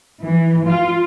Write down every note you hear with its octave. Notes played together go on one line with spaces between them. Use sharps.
E3
F4